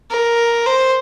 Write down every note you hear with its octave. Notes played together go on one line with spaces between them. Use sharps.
A#4
C5